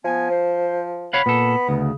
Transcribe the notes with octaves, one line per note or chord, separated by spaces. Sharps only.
F3 B3 G#5
C5
C#5 F5 F#5 B5
A#2 B3 A4
D2 C#3